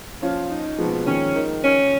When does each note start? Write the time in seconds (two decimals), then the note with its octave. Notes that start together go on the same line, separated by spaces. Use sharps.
0.22 F3 C#4 F4
0.51 D#4
0.78 B2 F3 G#3
1.07 D#3 C#4
1.36 D#3
1.64 C#4